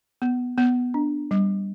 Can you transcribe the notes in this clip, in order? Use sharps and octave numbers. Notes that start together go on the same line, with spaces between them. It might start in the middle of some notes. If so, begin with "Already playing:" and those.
B3
B3
D4
G3